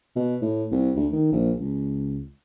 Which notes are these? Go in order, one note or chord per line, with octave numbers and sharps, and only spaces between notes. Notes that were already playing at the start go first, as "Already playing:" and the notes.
B2
A2
C2
D2
D#3
A#1
C#2